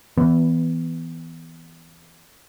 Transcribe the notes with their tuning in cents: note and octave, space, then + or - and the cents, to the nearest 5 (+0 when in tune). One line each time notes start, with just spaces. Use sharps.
E3 -5 B3 +10